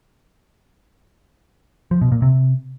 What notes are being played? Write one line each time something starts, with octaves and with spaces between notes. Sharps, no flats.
F3
B2
A#2
C3